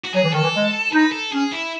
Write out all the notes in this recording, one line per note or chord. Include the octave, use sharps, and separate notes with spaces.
F#4
F#3 G#4
E3
D#3 A4
E3
G#3
D#4 B4
A4
C#4 G#4
E4